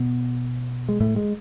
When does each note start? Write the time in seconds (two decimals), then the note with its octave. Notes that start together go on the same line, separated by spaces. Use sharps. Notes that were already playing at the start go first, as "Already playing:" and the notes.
Already playing: B2 B3
0.89 G#3
1.01 A2 A3
1.16 G#3